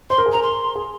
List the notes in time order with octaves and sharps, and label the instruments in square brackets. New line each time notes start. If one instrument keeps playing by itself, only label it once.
[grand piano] C5 [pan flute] C6
[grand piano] A#4
G#4
[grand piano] A#4 [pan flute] A#5
[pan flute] C6
[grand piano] G#4